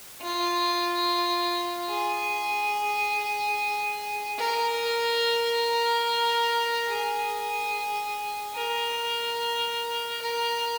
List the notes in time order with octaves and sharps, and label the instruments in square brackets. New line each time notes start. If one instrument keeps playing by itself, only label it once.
[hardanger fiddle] F4
G#4
A#4
G#4
A#4
A#4